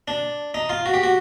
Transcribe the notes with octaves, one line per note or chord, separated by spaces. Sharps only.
D4
D#4
F4
F#4
G4
F#4